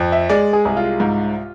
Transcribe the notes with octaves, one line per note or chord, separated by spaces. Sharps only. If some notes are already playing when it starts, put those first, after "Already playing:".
Already playing: F2
E5
G#3 D5
G#4
C2 G#4
F4
G#2